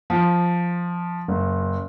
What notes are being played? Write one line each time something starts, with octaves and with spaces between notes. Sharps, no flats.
F3
F#1